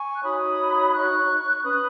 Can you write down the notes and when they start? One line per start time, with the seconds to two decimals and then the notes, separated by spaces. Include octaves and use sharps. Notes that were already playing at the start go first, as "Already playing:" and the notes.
Already playing: G#5 C#6
0.16 F#6
0.24 D#4 F#4 C#5 B5 D#6
0.93 C#6 F#6
1.63 C#4 B4 B5 D#6